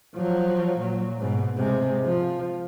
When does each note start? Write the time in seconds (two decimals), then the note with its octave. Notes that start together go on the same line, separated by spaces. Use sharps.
0.15 F3 F#3
0.79 A#2 F#3
1.19 G#2 B2
1.58 C3 G#3
2.05 F3